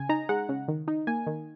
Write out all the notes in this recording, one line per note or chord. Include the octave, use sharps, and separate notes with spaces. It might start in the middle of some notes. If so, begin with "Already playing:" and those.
Already playing: C#3 G#5
D#4 A#5
G#3 F#5
C#3
D#3
D#4
A#3 G#5
D#3